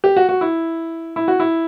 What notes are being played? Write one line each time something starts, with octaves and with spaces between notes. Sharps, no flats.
G4
F#4
F#4
E4
E4
F#4
E4